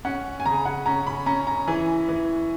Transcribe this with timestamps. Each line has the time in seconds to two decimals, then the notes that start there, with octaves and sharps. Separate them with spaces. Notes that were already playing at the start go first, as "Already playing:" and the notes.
0.05 C#4 F#5
0.40 G#5
0.46 C#3 A#5
0.65 F#5
0.86 C#4 A#5
1.07 B5
1.26 C#4 A#5
1.47 A#5
1.68 E3 G#5
2.09 E3